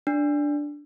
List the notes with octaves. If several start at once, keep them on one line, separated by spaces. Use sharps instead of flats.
D4